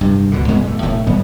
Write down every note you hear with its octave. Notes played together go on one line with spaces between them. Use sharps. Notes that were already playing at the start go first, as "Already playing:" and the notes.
G2 C3
C#2 B2 D3
G2 B2 G#3 B3
A1 A3
E1 A2 A3
G1 G#2 G3 B3